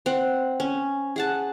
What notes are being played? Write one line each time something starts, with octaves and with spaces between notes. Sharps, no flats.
C4 F#5
C#4
G#4 F#5 A5